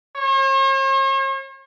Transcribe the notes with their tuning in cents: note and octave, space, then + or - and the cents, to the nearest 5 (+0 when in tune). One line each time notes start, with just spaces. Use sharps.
C#5 -45